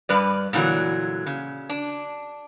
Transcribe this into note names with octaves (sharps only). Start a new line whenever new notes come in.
G2 G3 B4 D5
A#2 D3 E3 F#3
C#3
D4